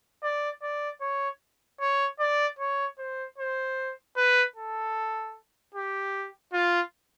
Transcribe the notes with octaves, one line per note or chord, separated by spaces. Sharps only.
D5
D5
C#5
C#5
D5
C#5
C5
C5
B4
A4
G4
F4